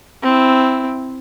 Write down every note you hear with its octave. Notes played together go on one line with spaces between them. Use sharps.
C4 E4